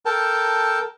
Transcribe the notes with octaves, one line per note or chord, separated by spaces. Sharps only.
A4 A#4 G5 A5